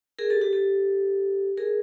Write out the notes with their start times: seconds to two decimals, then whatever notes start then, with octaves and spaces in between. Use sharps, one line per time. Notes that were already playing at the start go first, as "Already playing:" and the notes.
0.19 G#4 A#4
0.30 G4 A4
0.41 G4 A4
0.53 G4 A4
1.57 G#4 A#4